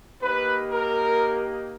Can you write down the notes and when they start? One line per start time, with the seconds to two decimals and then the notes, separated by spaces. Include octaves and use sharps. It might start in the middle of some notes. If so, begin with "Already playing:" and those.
0.21 A#3 D#4 G4 B4
0.70 A#4